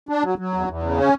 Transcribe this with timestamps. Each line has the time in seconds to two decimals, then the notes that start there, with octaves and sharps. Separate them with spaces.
0.09 D4
0.24 F#3
0.38 F#3
0.54 E2
0.68 E2
0.83 C#3
0.98 C#4